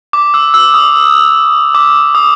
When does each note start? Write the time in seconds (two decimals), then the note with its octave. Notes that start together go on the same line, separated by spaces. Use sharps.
0.13 D6
0.34 E6
0.54 E6
0.74 D#6
1.75 D6
2.15 D#6